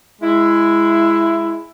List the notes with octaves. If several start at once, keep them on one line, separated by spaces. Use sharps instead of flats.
G#3 E4